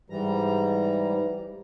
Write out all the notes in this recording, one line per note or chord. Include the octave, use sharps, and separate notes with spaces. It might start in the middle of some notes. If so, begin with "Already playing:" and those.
G#2 E3 G3 A#5